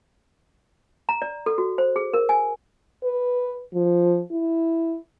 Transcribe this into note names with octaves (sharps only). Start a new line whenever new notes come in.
A#5
D5
A4
F#4
C5
G#4
A#4
G#5
B4
F3
E4